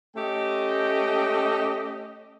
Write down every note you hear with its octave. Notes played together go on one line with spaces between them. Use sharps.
A3 C#4 G4 D#5 G5